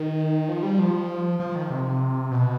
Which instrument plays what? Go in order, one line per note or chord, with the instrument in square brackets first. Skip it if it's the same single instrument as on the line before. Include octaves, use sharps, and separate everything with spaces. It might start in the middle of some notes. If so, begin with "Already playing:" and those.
Already playing: [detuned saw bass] D#3
F3
G3
F3
F3
D#3
C3
B2